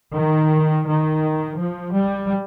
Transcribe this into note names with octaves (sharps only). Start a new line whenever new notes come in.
D#3
D#3
F3
G3